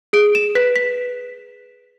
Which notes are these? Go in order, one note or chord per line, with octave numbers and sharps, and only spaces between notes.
G#4 D7
E7
B4 B6
B6